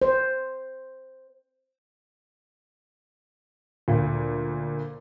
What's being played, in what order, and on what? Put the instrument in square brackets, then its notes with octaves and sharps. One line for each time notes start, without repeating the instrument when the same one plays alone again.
[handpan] C5
[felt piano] D2 A#2